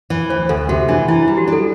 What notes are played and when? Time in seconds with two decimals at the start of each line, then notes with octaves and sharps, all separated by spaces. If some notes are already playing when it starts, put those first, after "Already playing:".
0.10 E3
0.30 D2 C5
0.49 D2 A4
0.69 C3 F#4
0.89 E3 D4
1.08 E3 E4
1.22 E4
1.28 G3
1.38 F#4
1.47 D4
1.53 A4